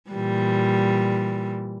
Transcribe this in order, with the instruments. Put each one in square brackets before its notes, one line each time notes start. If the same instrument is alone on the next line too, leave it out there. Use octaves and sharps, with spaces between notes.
[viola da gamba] A#2 E3 G3